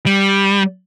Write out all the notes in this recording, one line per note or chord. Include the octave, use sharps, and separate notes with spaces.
G3